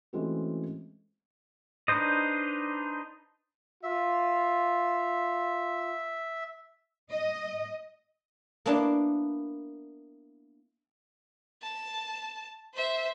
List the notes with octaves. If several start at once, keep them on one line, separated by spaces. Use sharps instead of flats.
E3 G#3 A3 C4 C#4 F#4
D4 D#4 B4 C5 D#5
F4 E5
D#5
A#3 B3 D4 E4
A5
C5 E5